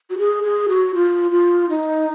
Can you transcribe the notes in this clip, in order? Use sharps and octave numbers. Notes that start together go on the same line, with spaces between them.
F#4
G#4
G#4
F#4
F4
F4
D#4